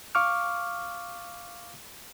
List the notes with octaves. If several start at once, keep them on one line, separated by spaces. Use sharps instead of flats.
F5 C#6 D6 F6